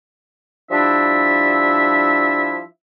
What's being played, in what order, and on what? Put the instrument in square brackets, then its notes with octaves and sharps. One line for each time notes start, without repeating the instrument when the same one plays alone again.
[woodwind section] F3 G3 D4 E4 E5